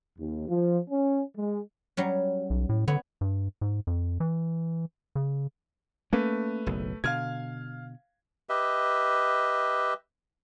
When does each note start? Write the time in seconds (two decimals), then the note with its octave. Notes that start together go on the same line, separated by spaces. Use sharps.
0.18 D#2
0.46 F3
0.89 C#4
1.35 G#3
1.97 F#3 G3 C#4
2.50 B1
2.69 A2
2.88 D3 B3 C#5
3.21 G2
3.61 G#2
3.87 F2
4.20 E3
5.15 C#3
6.13 A3 A#3 C#4 B4
6.66 F#1 B1
7.04 B2 D3 F5 F6 G#6
8.49 G4 B4 D#5 E5